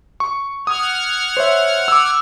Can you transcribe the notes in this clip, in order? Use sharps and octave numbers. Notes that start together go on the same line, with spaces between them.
C#6
F#5 D#6 F6 G#6
C5 C#5 E5
D6 E6